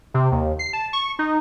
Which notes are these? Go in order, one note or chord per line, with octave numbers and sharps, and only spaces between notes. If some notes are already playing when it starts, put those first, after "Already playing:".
C3
D#2
C7
A5
C#6
D#4